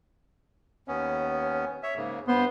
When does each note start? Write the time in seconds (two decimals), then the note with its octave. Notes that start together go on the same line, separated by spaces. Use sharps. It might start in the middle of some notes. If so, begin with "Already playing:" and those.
0.88 D#2 B3 C#4
1.83 C#5 E5
1.96 G#2 C#3 A#3
2.28 G2 B3 C5 C6